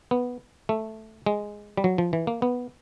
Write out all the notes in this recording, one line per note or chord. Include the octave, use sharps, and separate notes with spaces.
B3
A3
G#3
G3
F#3
F3
E3
A#3
B3